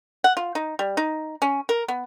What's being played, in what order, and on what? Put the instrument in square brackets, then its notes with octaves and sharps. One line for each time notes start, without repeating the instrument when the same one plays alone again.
[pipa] F#5
F4
D#4
G3
D#4
C#4
A#4
B3